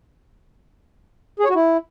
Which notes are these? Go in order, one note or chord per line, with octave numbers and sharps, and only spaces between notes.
G#4
C#5
F#4
E4